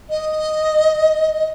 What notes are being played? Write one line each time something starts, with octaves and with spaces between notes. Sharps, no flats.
D#5